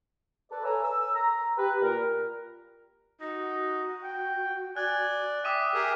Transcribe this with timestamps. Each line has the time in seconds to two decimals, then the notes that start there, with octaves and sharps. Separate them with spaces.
0.52 A4 B4 D5
0.65 A4 B4 C#5 E5 G#5 A#5
0.84 E6
1.15 A#5
1.58 G4 B4
1.82 A#2 A#4
3.21 D#4 F#4
4.04 G5
4.76 D5 G#5 F#6
5.45 E5 G5 D6 D#6 D#7
5.74 G4 G#4 A#4